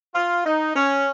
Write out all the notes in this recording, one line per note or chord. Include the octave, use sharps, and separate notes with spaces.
F4
D#4
C#4